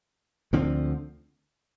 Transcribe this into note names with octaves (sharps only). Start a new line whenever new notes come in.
D2 D3 F3 C4